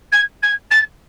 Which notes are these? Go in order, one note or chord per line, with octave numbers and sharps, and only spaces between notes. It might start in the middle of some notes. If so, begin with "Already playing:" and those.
G#6
G#6
A6